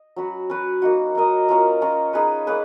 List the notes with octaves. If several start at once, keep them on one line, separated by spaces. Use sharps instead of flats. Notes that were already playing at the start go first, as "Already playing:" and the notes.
Already playing: D#5
F#3 C#4 F#4 B4
C#4 F#4 B4
A#3 D#4 F#4
D#4 A#4 D#5
C#4 F4 A#4
C#4 F4 A#4
D#4 G#4 B4
A#3 C#4 G#4 B4